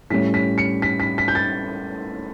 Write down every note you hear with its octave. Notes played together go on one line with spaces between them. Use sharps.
A2 G3 C#4 B6
B6
C#7
B6
B6
B6
G6
A6